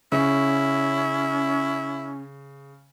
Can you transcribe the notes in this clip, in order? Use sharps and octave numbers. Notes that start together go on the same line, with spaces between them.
C#3 C#4 E4